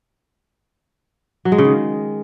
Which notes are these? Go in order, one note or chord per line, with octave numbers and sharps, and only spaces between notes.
F#3
G#3
C#3
D#3